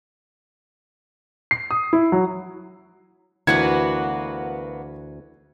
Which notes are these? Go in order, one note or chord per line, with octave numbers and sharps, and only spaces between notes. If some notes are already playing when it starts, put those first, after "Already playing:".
C7
D#6
E4
F#3
D2 E3 A#3 B3 F#4 G#6 C#7